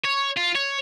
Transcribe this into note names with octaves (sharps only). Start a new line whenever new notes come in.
C#5
F4
C#5